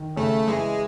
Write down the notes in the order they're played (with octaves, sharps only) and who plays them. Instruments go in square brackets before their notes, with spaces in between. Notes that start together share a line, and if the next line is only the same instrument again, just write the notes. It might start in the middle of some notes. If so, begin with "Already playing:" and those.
Already playing: [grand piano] D#3
[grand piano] C#3 [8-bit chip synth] A3
[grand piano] E3 [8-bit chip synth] G#3